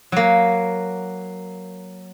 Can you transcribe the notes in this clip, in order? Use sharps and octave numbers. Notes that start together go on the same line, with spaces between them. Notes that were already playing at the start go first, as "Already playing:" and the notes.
F#3 A#3